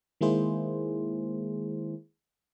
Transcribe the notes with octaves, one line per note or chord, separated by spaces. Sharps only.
D#3 G#3 A#3 E4 G#4 C5